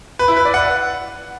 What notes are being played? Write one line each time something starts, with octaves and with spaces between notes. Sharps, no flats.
B4
E4
B4
D5
F#5